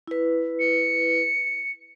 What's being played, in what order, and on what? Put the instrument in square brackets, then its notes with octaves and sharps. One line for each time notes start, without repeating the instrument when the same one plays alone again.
[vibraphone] E4 B4
[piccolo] C#7